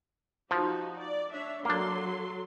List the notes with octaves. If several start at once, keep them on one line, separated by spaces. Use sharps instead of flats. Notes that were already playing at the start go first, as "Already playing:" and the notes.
F3 D#4 F#4 G4
D5
D4 C#5 E5
F#3 A#3 D4 A4 C6